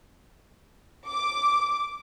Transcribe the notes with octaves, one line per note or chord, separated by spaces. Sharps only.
D6